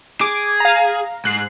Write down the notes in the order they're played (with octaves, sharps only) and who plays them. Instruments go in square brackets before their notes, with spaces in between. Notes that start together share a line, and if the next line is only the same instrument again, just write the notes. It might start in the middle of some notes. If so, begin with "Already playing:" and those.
[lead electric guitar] G#4 [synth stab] D6
[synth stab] F5 A#5
[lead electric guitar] G#2 [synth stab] F#6 C7